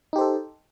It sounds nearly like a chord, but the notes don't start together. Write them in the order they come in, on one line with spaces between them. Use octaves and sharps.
D#4 G4 C5 A4